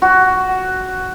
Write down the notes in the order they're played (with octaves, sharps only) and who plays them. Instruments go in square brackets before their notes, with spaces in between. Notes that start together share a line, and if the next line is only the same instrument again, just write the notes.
[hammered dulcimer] F#4